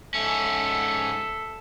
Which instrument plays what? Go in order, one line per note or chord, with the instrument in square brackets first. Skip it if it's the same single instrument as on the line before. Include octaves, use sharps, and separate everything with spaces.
[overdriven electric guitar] G#2 C#4 [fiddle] A4 [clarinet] E5